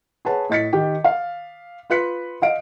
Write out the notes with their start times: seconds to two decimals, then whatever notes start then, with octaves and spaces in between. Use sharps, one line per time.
0.25 G#4 B4 C#5 F#5 A5
0.50 A2 D#5 A6 B6 C#7
0.73 D#3 G4 G5
1.04 F5
1.90 F4 B4 F#6 B6 C#7
2.42 D#5 F5 D7